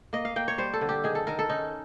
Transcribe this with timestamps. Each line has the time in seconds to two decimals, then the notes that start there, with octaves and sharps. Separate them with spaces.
0.13 A#3 D#5
0.25 F5
0.36 A#3 G5
0.48 C#5
0.58 G3 C5
0.74 A4
0.81 D3
0.89 G4
1.04 D#3 G#4
1.15 A4
1.27 D#3 A#4
1.39 A4
1.49 C#4 D#4